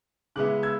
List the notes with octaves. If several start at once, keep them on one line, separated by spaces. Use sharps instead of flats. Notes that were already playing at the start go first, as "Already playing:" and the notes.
C#3 G#3 B3 E4 D6 F#6
E6 G#6